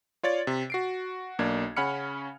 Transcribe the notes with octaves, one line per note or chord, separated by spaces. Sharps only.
F4 C#5 D5 A6
C3
F#4 C7 D7
B1 A#3 D4 G#6
C#3 C#4 F#5 B5 F6 C#7